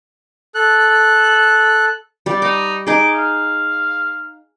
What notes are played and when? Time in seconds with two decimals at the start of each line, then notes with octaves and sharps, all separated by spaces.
0.55 A4 F#6
2.26 G3 G4 D5
2.42 D#4 D6
2.87 D#4 G#4 D6
3.15 F5